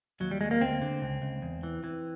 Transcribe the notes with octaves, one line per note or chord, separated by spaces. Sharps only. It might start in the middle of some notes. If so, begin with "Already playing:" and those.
D#2 F#3
G3
D#2 G#3
A#3
D2 C4
D3
C#2
C#2
E2
E3
E3